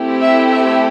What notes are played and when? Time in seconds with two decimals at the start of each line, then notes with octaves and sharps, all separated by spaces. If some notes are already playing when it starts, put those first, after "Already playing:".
Already playing: A3 C4 E4 G4
0.20 E5
0.50 E5